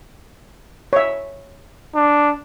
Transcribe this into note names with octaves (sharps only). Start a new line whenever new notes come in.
C#5 E5
D4